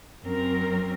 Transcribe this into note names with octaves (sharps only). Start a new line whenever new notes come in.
F#2 C4 A#4